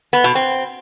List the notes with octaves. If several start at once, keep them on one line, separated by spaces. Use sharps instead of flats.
B3
B2
C4